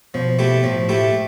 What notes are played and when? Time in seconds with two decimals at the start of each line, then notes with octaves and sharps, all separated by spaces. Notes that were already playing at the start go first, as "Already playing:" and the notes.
0.14 B2 F3
0.39 A3 E4 G4
0.64 A2 F3
0.89 A3 E4 G4